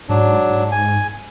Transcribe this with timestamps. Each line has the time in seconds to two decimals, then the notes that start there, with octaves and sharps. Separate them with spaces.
0.09 G#2 F#3 D4
0.50 G#2
0.72 G#5